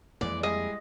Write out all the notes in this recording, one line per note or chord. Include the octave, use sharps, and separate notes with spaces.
F2 E3 G#3 A#3 D5
G3 G#3 E4 G#4 D#5